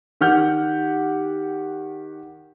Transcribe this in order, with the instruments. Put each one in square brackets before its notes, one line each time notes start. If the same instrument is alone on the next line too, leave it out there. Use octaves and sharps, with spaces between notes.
[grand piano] D#3 G4 F#5 F6 G6